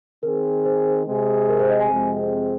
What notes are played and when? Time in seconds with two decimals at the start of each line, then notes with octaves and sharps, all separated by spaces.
0.23 D#3 C4 G#4 A#4
0.65 C5
1.07 C3 G#3 C4 G#4
1.49 A#4
1.59 C5
1.69 D#5
1.80 G#5
1.90 F2 C3 G#3 C4